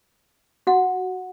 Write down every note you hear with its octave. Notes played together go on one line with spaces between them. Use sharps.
F#4 F#5